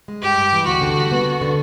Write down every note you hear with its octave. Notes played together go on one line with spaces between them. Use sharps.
G#3
G2 G4
G2
E3
D2 F#4
D3
G3
B3
D2
D3